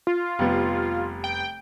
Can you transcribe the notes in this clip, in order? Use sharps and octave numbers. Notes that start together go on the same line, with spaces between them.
F4
F1 G3 B3
G5